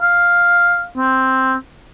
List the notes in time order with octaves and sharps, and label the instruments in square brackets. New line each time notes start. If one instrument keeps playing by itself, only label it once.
[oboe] F5
C4